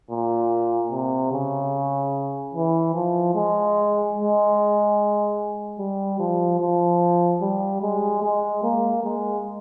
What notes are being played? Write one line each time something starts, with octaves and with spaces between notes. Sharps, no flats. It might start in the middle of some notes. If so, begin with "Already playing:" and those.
A#2
C3
C#3
E3
F3
G#3
G#3
G3
F3
F3
G3
G#3
G#3
A#3
G#3